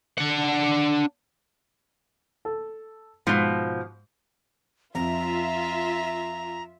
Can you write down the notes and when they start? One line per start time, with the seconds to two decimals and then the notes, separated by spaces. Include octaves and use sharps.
0.18 D4 F#5
2.45 A4
3.27 G#2 B2 F3
4.95 F2 F4 E5 A#5